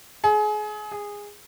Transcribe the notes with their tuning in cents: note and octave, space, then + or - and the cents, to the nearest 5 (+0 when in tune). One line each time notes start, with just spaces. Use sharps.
G#4 +30
G#4 -15